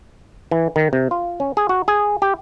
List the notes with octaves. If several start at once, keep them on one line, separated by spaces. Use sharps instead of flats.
E3
D#3
C3
F4
C#4
G#4
F#4
G#4
G4